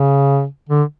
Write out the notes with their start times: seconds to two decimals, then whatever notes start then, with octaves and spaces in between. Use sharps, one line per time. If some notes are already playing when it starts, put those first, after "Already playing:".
Already playing: C#3
0.69 D3